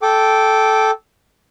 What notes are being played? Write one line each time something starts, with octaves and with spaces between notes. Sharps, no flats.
A4 G5 D6